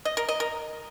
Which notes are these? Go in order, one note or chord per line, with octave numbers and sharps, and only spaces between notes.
D#5
A#4
D#5
A#4